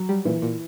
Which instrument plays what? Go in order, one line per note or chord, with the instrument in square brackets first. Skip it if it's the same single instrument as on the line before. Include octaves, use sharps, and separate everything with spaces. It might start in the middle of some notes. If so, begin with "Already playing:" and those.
Already playing: [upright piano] F#3
[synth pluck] G3
[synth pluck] A#2 [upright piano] E3
[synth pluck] A#2